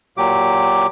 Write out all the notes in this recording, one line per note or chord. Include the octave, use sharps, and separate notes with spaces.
A#2 F#3 G4 D6